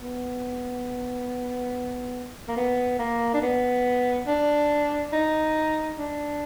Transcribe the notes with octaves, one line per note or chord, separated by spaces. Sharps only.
B3
A#3
B3
A#3
D4
B3
D4
D#4
D4